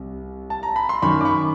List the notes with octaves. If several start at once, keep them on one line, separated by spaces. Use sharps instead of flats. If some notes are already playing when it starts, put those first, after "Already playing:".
Already playing: C2 C3
A5
A#5
B5
C6
F#2 D#3 B5 C#6
D6
B5 C#6